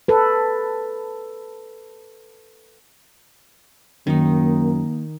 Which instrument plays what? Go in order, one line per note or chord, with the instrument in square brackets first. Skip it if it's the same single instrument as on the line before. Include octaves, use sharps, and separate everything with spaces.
[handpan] A4 B4
[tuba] F#2 [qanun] D#3 D#4 [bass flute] A#3